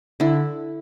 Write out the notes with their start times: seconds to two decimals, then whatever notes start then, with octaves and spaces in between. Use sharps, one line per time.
0.20 D3 E4